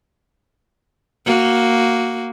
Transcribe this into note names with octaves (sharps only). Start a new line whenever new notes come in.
A#3 F#4